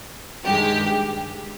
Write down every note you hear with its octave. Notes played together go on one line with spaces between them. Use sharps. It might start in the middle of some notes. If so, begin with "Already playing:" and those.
G2 D#3 G#3 G4